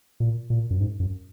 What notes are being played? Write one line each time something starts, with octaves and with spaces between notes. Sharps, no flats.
A#2
A#2
F#2
G#2
F#2